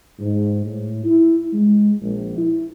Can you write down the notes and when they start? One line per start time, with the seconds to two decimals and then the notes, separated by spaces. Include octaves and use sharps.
0.19 G#2
0.65 A2
1.04 E4
1.53 G#3
2.02 A#1
2.38 E4